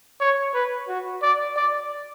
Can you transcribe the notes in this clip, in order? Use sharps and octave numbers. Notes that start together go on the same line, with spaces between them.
C#5
B4
F#4
D5
D5